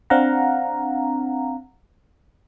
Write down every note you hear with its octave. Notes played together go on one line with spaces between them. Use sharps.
C4 D4 F5 F#5 A#5